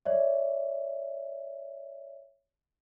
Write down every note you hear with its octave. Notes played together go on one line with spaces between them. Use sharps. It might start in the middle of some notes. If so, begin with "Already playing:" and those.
C#5 D5 E5